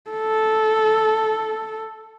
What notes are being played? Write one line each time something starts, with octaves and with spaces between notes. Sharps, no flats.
A4